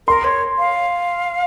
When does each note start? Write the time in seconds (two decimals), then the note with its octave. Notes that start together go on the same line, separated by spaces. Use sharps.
0.08 A#4 C6
0.24 C#5
0.58 F5